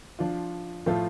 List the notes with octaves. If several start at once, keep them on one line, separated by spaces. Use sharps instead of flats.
F3 D4 F4
A2 F3 A3 F4 A4